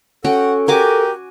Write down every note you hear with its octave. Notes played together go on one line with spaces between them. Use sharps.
C#4 F#4 A4 F#5 G5
F#4 G4 A#4 G#5 D6